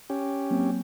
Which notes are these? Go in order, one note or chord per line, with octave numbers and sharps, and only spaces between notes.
C#4 G4
F#3 A#3 C4